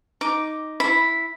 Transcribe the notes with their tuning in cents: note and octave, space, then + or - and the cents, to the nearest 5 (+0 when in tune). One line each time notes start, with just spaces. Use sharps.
D#4 +0 D6 +0
E4 +0 B5 +0